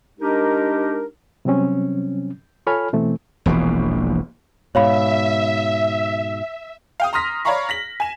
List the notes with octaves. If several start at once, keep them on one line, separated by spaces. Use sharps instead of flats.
G#3 D4 D#4 G4 A#4
C3 F#3 G3 C4 C#4
F4 A4 C#5 G#5 B5 F6
B2 E3 A3 C4
E1 A#1 B2 E3
G#2 B2 C#5 E5 F5 B5
F5 G5 D#6
A#5 C6 D#6 F6 A#6 B6
C#5 D5 F5 A#5 B5 C#6
A#6 B6 F#7
G#5 E7